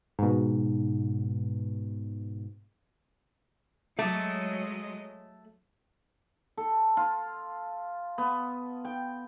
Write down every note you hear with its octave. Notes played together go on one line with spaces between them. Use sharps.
G#2 B2
F#3 G#3 A3 D#5
A4
F4
B3
G5